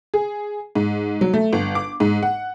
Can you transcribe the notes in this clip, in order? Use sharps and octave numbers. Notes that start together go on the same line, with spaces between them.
G#4
G#2
F#3
A3
G1
D6
G#2
F#5